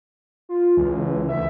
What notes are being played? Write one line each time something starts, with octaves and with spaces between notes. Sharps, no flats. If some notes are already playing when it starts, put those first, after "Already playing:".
F4
C#2 E3
D2 E5